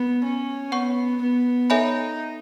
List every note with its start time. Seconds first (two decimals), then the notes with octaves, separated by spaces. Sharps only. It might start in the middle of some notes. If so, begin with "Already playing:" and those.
Already playing: B3
0.24 C#4
0.72 B3 C#5 F#5 C#6
1.21 B3
1.70 D#4 A4 C#5 E5 G#5 B5